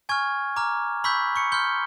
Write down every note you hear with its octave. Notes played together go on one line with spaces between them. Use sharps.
G#5 C#6 F6 G#6
A#5 D6 F6
B5 C#6 E6 G6 B6
C#6 C#7
C6 F6 G6 G7